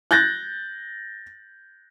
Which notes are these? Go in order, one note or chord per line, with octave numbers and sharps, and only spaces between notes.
F#6 G6 A6 A#6